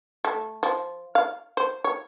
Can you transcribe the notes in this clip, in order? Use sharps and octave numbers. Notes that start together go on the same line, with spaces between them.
A3
F3
F5
C5
C#5